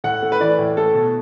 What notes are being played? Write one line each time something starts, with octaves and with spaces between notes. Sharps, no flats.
A2 F#5
A3
B4
E3 D5
A2
A3 A4
B2